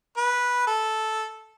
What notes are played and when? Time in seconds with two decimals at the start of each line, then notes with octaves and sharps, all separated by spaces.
0.17 B4
0.67 A4